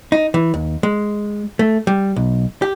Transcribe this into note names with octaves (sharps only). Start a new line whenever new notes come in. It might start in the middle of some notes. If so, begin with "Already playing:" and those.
D#4
E3
D#2
G#3
A3
G3
B1
G4